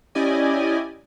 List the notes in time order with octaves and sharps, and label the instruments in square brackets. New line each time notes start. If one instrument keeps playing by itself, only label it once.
[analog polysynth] C#4 E4 G4 D5 D#5 G#5